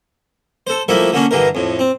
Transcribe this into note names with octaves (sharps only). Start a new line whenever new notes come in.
A4 C5
F3 G3 A3 A#3 E4
D3 A#3 C#4 D4
G2 D3 E3 A#4
F2 A2
C4